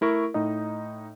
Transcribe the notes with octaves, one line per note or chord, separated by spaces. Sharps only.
A3 E4 A#4 C#6
A2 D#4 D#5